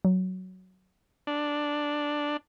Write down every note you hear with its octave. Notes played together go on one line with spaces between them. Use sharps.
F#3
D4